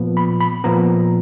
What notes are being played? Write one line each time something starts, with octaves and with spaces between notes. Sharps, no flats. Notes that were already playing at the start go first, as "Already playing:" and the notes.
Already playing: A#2 F3 B3
B5
B5
A#2 F3 B3 A#5